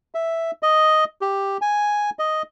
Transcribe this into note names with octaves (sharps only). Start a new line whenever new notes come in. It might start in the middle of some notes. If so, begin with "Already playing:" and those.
E5
D#5
G4
G#5
D#5